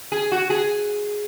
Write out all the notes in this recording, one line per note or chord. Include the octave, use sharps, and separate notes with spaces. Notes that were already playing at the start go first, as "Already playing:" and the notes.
G#4
F#4
G#4